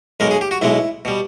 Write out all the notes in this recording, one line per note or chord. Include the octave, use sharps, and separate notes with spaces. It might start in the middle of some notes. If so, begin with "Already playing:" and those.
B1 B2 G#3 A#4
G#4
G4
F#4
B1 B2 G#3 E4
B2 G3